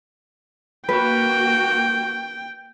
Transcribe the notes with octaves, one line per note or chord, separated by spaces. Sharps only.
A#3 F#4 B4 G5